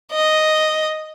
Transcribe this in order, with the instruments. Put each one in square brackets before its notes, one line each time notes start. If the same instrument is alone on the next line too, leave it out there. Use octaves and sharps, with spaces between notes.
[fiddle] D#5